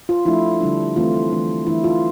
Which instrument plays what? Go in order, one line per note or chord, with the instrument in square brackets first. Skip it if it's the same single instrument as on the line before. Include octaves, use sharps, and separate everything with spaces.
[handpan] F4
F3 A3 D4 E4
D3 G3 D4
E3 A3 C4 F4
E3 A3 D4
E3 A3 D4 E4
F4